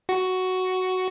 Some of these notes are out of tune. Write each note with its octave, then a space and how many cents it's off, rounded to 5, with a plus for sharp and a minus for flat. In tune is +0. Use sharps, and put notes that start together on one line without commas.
F#4 +5